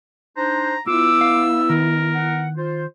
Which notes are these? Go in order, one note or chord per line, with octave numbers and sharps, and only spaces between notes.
D4 D#4 C5 A#5
B3 E4 F4 D6 E6
F5
D#3 A#4
F#5
F4 C5